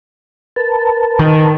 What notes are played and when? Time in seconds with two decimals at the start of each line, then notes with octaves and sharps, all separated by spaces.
0.56 A#4 B4 A5
1.19 D#3